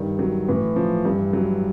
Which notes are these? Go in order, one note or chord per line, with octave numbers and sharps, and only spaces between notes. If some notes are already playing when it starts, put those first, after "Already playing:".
Already playing: G2 D#3
F#3
A2 E3
F3
G2 E3
F#3